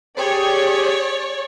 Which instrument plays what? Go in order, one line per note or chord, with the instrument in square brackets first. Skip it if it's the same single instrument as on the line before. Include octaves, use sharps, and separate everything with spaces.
[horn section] G4 G#4 [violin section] C#5 D5